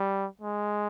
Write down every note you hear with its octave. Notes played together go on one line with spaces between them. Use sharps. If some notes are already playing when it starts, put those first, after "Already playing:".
Already playing: G3
G#3